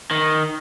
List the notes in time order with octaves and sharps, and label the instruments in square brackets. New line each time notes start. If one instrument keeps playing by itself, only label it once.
[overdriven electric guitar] D#3